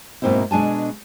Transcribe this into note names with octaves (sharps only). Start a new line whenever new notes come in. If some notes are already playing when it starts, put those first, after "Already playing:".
G#2 B2 A#3 C4 D#4 E4
B2 G#3 D4 G#5 A5